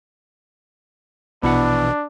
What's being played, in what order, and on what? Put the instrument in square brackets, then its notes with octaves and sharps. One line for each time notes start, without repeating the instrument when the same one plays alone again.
[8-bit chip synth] A#1 B2 E3 [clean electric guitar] B3 E4 F#5 [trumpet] D4